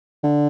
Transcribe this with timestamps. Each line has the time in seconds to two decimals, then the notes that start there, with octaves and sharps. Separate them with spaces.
0.24 D3